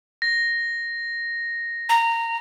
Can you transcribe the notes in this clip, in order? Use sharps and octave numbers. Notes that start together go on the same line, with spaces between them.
A#6
A#5